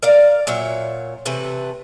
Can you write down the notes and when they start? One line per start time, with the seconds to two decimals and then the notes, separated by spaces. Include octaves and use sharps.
0.03 A#4 D5 F5
0.47 A#2 F#3 C#5 E5
1.25 C3 E3 A3 B4